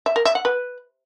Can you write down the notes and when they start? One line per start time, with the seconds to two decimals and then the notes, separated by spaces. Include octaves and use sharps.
0.06 E5
0.16 A#4
0.25 E5
0.35 F#5
0.45 B4